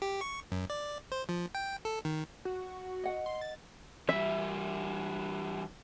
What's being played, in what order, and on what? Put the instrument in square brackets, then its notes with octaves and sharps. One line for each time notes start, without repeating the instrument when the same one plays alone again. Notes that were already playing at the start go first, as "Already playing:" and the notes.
[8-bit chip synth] G4
C#6
F#2
D5
C5
F3
G5
A4
D#3
[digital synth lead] F#4
[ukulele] D#5 F#5
[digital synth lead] C6
A6
[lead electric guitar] E3 G3 [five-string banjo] E5